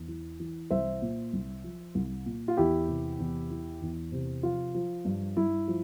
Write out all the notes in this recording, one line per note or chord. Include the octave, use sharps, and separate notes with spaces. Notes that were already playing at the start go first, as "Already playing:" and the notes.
Already playing: E2
E3
E3
C2 C5 E5
A#2
C2
F3
C2
A#2
F4
E2 E4 G4
C3
E2
E3
E2
C3
F3 F4
F3
G2
G2 E4
F3